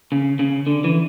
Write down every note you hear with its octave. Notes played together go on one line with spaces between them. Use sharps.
C#3
C#3
D3
E3